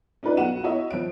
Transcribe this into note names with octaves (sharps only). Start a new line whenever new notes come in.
C#4 D#4 F4 B4 D5
B1 F#4 F#5 D#7 E7
E4 F#4 C#5 D#5 E5
F3 D7